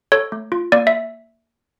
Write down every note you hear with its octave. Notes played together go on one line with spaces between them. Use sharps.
A4 C#5
A3
F4
A#3 D5
E5